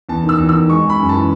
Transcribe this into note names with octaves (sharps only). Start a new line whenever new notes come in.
E2 A5
D#3
E6
E2
D#3 E6
G#3 C#6
G#3
B5
F#2
E3 A5